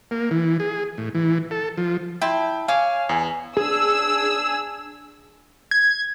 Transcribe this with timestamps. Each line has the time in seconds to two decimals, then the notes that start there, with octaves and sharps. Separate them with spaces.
0.11 A#3
0.31 E3
0.60 G#4
0.98 A2
1.15 E3
1.51 A4
1.77 F3
2.21 E4 G5 A5 C6
2.68 C#5 F5 G#5 D6
3.09 E2 G#4
3.57 D4 G#4 E6
5.71 G#6